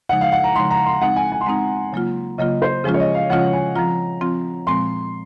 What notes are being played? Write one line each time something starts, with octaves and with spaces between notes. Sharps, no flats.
C#3 F3 G#3 D#4 F#5
F5
F#5
A#5
C#3 F3 G#3 D#4 C6
A#5
C6
G#3 C4 D#4 F#5
G#5
G#5
C6
G#3 C4 D#4 A#5
C#3 F#3 A#3 F4
C#3 F#3 A#3 F4 D#5
C5
C#3 F3 G#3 C#4 F4 G#4
C#5
D#5
F5
C#3 F3 G#3 C#4 F4 F#5
G#5
F3 C4 F4 A#5
F3 C4 F4
A#2 F3 G#3 C4 C6